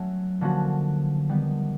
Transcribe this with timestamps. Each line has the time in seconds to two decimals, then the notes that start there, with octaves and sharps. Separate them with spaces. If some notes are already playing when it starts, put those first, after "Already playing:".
Already playing: F#3 A3 C#4 F#4
0.41 D3 F3 A#3 C#4 F#4
1.29 D#3 G3 B3